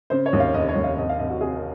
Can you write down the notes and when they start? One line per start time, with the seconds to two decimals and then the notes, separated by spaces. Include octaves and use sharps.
0.10 C#3 C5
0.26 C#5
0.33 D#2
0.40 F5
0.54 F1 D#5
0.69 C#5
0.76 D#2
0.84 F5
0.98 C2 D#5
1.09 F5
1.19 C2 D#5
1.30 F#4
1.41 C3 G#4
1.56 A#4